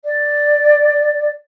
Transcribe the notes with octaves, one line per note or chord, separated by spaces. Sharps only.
D5